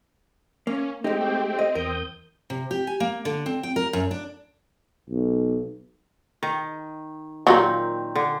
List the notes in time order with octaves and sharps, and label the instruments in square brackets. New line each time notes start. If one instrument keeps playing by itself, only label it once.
[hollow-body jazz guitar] A#3 [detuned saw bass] C#4
[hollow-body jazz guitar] G#3 D#4 [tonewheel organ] A3 G4 G5 [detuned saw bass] C4
[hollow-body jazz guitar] D#5
[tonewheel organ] E2 D#6 G6 [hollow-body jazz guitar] A#4
[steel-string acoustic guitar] C3
G4
G#5
A#3
D3
C4
G5
A#4
F#2
D4
[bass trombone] B1
[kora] D#3
[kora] A#2 D#3 C4 [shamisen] F#3 G3 A#3
[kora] D3